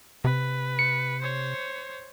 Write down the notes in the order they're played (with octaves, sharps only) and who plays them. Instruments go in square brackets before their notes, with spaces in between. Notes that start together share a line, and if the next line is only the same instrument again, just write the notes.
[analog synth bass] C3 [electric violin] B4
[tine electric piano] C#7
[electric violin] C5 C#5